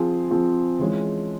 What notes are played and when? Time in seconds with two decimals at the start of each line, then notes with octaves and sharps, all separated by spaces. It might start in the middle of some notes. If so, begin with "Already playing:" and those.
Already playing: F3 C4 F4 G#4
0.30 F3 C4 F4 G#4
0.80 E3 G#3 C#4 F4 G#4